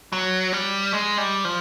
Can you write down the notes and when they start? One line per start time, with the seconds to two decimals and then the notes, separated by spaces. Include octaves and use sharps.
0.13 F#3
0.53 G3
0.93 G#3
1.18 G3
1.45 F3